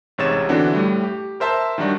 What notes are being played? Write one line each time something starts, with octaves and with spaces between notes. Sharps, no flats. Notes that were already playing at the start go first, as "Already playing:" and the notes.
A1 G#2 C3 C#5 A6 E7
D3 E3 B3 C4 D4 F#4
A2 G3 A3
G4
A#4 C5 E5 A5
D#3 F#3 G3 D4 F#4